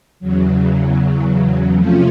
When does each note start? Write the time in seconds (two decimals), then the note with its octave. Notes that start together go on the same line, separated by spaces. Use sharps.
0.20 E2 C#3 F#3
1.75 C3 F3 A3 C#4 F4